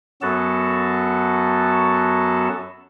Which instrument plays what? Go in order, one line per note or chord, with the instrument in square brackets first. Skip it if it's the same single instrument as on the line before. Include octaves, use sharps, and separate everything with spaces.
[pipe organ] F#2 F#3 B3 F#4 A4 A5